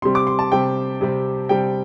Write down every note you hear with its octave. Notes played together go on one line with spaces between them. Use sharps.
C3 G3 C4 C6
D6
C6
A5
C3 G3 C4 G5
C3 G3 C4
C3 G3 C4 G5